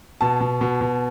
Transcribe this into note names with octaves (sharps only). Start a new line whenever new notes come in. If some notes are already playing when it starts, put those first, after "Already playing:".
B2 A5
B2
B2
B2